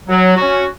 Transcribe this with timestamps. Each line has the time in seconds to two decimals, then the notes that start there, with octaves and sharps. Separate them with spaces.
0.08 F#3
0.36 C#4 F#4